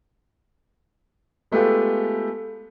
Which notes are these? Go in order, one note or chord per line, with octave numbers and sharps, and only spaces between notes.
G#3 A3 B3 F4 G4 A4